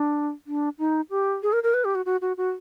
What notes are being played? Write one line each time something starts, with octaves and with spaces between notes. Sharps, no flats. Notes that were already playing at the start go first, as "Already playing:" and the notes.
Already playing: D4
D4
D#4
G4
G#4
A#4
A#4
B4
G4
F#4
F#4
F#4
F#4